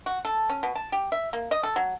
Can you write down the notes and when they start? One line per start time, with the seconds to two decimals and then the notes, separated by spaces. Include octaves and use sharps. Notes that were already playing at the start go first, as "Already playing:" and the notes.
0.06 F#4
0.25 A4
0.49 C#4
0.63 B2
0.75 A5
0.92 G4
1.12 E5
1.33 A#3
1.51 D#5
1.63 A4
1.76 F#3